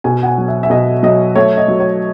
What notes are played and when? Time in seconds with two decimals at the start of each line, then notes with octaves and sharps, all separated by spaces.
0.04 B2 G#5
0.23 F#5
0.26 G#5
0.38 F#3
0.48 E5
0.63 E5
0.70 B2 D#5
1.03 F#3 D#5
1.35 A3 C#5
1.57 D#5
1.68 F#3
1.80 C#5